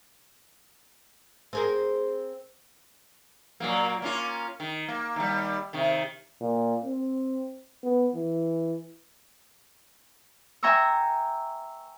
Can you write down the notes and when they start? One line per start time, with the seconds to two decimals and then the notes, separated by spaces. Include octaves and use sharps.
1.53 C4 G#4 A#4
3.60 A#2 F#3 A#3
4.02 A#3 C#4 F4
4.60 D#3
4.88 A#3
5.16 D#2 G3
5.73 C3 D#3
6.42 A#2
6.85 C4
7.84 B3
8.15 E3
10.63 E5 G5 G#5 A#5 C#6 E6